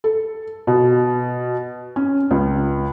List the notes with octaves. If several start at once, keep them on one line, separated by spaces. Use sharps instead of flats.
A4
B2
C#4
C#2